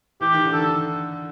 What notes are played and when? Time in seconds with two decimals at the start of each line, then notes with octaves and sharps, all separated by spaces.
0.21 E3 G4
0.33 D#3
0.45 D3
0.53 D#3 A4